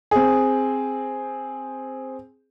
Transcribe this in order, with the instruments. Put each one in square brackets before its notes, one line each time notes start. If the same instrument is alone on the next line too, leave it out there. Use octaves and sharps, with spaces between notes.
[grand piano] C4 G#4